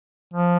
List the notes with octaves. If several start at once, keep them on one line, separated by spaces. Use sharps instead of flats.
F3